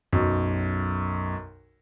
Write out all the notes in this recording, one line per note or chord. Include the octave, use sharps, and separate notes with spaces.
B1 F#2